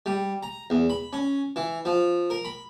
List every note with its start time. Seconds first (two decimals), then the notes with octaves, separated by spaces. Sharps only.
0.06 G3
0.43 A#5
0.70 E2
0.90 B5
1.13 C#4
1.56 E3
1.85 F3
2.30 A#4
2.45 B5